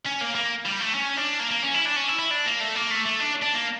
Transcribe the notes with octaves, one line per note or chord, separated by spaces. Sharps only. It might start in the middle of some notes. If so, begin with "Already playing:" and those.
C#4
A#3
A#3
G3
A3
C#4
D4
A#3
A#3
C#4
E4
D4
C#4
E4
E4
D4
A#3
A3
A#3
A3
A3
D4
D4
A#3